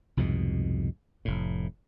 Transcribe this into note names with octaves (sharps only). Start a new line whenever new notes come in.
C2 F2 G#2 B2
F1 A2